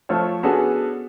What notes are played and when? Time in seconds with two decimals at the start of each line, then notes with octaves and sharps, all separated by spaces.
0.09 F3 A3 F4 A4 C5 C#5
0.43 B3 C#4 D4 F#4 G#4 A4